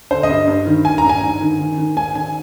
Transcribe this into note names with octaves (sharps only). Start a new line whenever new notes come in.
D3 C5
D#5
G2
G2
D#3
G2 G#5
A#5
G2
G#5
G#2
D#3
D#3
D#3
G#2 G#5
D#3 G#5